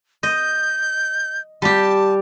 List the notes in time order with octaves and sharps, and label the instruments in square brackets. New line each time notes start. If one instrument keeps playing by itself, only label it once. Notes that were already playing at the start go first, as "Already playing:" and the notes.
[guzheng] D#5 [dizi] G6
[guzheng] G3 G4 [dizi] A5